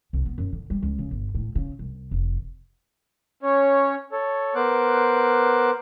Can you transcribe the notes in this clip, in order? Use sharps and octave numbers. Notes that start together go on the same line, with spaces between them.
C2
B3
F#2
D3
G3
C#2
C#3
G1
A2
C#3
C2
F1
C#4 C#5
A4 C#5
B3 A#4 C5 D6 F#6